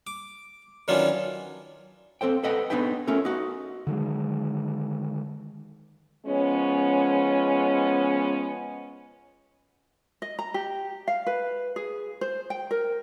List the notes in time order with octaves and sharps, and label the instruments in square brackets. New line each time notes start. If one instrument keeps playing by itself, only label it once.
[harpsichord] D6
D#3 E3 F#3 C#4 D4 F4
[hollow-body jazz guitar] C4 A4 C5 G5
A4 B4 D#5 F#5 G5
B3 D4 D#4 G#4 B4 G5
A3 C#4 F4 A4 A#4
D#4 F#4
[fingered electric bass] D3 D#3 F#3 G#3
[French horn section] F3 G#3 B3 C#4
[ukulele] D#5
A#5
G4
F5
B4
G#4
C5
G5
A#4